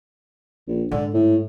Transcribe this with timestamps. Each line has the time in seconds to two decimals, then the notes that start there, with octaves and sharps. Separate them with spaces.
0.68 A#1
0.91 G#2 D3
1.14 A2